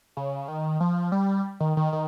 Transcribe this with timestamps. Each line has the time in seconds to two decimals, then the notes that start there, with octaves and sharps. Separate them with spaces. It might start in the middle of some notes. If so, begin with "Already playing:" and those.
0.17 C#3
0.48 D#3
0.80 F3
1.12 G3
1.60 D#3
1.77 D#3
1.93 D#3